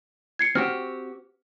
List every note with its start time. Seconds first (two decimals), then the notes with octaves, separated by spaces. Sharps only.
0.39 G#6 C7 C#7
0.55 C4 F#4 G4 F6